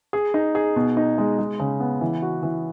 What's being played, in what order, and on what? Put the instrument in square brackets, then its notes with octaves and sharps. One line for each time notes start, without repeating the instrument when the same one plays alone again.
[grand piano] G#4
D#4
G#4
B2
D#4
G#3
G#3
C#3
B3
E3
F#4
E3